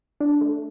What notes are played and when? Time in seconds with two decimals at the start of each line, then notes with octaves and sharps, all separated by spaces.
0.20 D4
0.41 A3